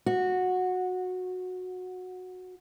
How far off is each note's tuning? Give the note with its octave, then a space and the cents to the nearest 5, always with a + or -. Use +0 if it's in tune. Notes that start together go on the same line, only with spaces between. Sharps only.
F#4 -15